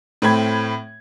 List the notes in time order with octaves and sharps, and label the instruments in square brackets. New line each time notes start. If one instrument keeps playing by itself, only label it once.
[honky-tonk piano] A2 A3 C4 B5 G#6